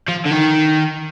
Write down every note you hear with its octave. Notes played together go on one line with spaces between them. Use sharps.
F3
D3
D#3